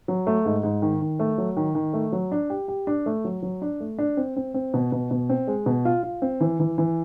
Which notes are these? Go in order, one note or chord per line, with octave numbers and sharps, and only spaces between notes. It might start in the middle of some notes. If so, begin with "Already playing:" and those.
F#3
A3
G#2
G#2
D#3
D#3
A3
F#3
D#3
D#3
A3
F#3
D4
G4
G4
D4
A3
F#3
F#3
D4
A3
D4
C4
C4
C4
B2
B2
B2
C4
G#3
B2
F4
F4
C4
E3
E3
E3